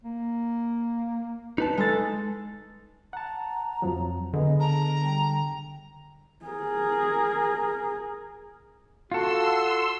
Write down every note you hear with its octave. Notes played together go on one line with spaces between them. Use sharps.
A#3
D#4 B4 A5
G#3 A4 A6
F#5 A5 A#5
F2 F3 F#3
D3 B3 G#4 D#5
A5 A#5
G3 G5
G#4 A#4
F4 F#4 A4 C6 E6